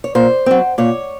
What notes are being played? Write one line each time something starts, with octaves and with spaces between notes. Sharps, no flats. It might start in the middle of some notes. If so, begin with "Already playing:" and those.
C#5
A#2 C5
F#3 C4
A#2 C#5